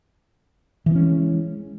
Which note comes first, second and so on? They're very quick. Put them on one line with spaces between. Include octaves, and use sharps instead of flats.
E3 B3 C#4 G#3